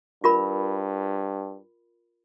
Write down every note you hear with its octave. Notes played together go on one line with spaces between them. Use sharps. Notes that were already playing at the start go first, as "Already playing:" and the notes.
G2 F4 A#4 B5